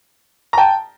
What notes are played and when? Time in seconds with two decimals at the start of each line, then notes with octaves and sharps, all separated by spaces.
0.53 A#5
0.57 G5 A5